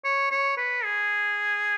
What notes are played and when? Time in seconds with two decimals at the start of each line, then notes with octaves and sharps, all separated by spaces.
0.05 C#5
0.31 C#5
0.57 B4
0.84 G#4